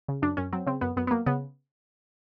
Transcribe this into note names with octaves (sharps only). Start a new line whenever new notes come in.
C#3
F#2 D4
F#2 C#4
F#3 C4
C#3 C4
F#2 B3
F#2 B3
B3
F#3 A#3
C#3 B3